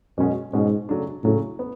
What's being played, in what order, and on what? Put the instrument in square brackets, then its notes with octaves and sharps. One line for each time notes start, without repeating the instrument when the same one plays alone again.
[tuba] F#2 [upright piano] B2 G#3 C#4 F#4
[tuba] G#2 [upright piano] B2 G#3 C#4 F#4
[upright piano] C#3 F#3 A3 D4
[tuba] A2 [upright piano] C#3 F#3 A3 D4
[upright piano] B3